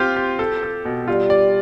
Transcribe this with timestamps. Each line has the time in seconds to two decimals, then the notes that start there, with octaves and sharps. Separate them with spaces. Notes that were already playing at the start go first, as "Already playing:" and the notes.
Already playing: C4 F4 G4
0.16 G4
0.39 A4
0.63 A4
0.85 B2
1.08 G3 F4
1.30 D5